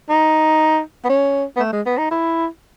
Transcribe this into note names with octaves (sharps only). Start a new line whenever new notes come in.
D#4
B3
C#4
B3
A3
G#3
B3
D#4
E4